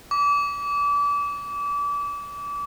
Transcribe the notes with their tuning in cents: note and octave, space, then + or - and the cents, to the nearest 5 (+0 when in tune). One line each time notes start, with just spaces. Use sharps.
D6 -30